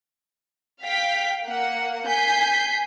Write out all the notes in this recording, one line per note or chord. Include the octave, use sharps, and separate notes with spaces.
F5 G5 B6
A#3 F#5
G#5 G6 B6 C7